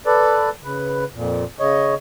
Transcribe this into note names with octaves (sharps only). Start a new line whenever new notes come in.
A4 B4 D5
C#3 B4
F2 A#2
C#3 C#5 D#5